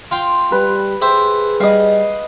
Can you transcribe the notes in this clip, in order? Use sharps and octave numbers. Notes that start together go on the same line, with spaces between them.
F4 G5 C6
G3 B4
G4 G#4 C5 E5
G3 D#5 F5